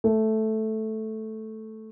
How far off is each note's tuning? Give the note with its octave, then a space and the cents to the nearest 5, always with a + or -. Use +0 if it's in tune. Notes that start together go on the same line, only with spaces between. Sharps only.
A3 -5